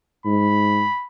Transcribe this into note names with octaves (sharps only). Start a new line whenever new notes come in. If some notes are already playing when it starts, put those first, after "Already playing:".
G#2 B5